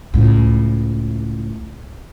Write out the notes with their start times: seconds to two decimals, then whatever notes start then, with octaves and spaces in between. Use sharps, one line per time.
0.14 C#2 A2